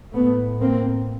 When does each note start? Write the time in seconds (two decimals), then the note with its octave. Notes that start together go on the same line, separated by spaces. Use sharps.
0.14 A2 A3 B3
0.60 A#3 C4